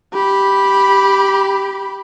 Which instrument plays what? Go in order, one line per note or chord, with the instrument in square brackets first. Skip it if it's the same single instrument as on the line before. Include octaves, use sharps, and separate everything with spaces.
[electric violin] G4 B5